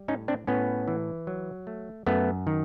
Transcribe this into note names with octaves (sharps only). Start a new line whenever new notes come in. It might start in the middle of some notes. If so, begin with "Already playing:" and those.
Already playing: G3
A2 C#4 D#4
C4 D4
A2 B3 C#4
E3
F#3
A3
F#2 A3 B3
D#3